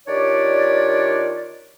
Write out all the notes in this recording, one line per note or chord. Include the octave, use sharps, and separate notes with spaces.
D#3 D4 F4 G4 C#5 D5